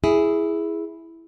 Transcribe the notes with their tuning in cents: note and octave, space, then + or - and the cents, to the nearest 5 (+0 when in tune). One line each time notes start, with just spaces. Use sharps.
E4 +0 G#4 +0